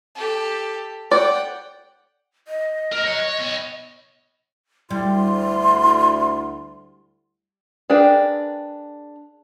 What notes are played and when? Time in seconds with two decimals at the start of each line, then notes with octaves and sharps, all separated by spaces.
0.15 G4 A4
1.11 D5 F#5 G5
2.48 D#5
2.92 A2 A#4
3.06 C#5 F#5
3.20 C#5
3.38 B3 C#5
4.90 D2 G3 E4 C6
7.90 D4 G#4 A#4 B4 G5